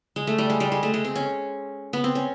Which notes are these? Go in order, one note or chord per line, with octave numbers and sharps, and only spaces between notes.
G#3
A3
G3
G#3
G3
G#3
A3
G#3
C4
C#4
B3
C4
C#4